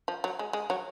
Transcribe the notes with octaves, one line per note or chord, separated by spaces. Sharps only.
F3
F#3
G#3
G#3
F#3